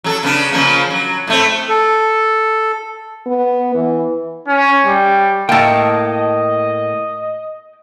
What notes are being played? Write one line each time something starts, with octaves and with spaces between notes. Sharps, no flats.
F#3 G#4 A4
C#3 B3 D4
C#3 F3 A#3
F#3
A2 A3 C4
A4
B3
E3
C#4
G3
A2 A#3 D#5 G5 A5